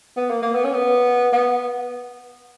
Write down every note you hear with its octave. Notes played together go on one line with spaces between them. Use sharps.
B3
A#3
A#3
B3
C#4
B3
B3